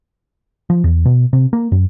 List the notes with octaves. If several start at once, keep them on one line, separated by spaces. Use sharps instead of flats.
F3
E2
B2
C3
A#3
F#2